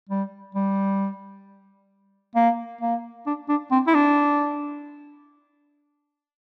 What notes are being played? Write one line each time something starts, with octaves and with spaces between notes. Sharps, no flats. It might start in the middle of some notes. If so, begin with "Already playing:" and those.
G3
G3
A#3
A#3
D4
D4
C4
E4
D4